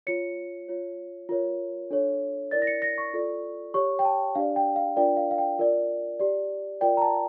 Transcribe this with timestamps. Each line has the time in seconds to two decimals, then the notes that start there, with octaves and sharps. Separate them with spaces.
0.07 F4 C#5 C#7
0.68 F4 C#5
1.29 F4 A#4 C#5
1.91 D4 A4 C#5
2.51 E4 A#4 D5 A6
2.62 A#6
2.67 C#7
2.82 A#6
2.98 C#6
3.14 F4 A4 D5
3.74 G4 C#5 C#6
3.99 G5
4.05 A5
4.35 D4 G4 D5 F5
4.56 G5
4.76 F5
4.97 D4 F4 A#4 D5 G5
5.17 F5
5.31 F5
5.38 G5
5.59 F4 A#4 D5
6.19 G4 D5
6.81 F4 A#4 D5 G5
6.97 A#5
7.02 A5